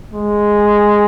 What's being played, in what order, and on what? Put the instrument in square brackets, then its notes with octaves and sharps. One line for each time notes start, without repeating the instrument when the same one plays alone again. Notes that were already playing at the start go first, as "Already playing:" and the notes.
[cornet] G#3